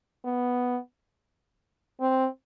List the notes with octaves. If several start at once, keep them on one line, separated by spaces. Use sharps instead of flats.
B3
C4